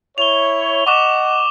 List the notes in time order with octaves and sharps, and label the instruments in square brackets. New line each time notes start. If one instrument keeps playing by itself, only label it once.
[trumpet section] E4 C#5 [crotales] F7 G7
[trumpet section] D#5 F#5 [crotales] C#6 D6 E7